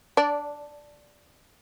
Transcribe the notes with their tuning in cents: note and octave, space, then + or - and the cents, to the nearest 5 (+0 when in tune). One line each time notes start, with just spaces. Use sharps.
D4 +0 D5 -20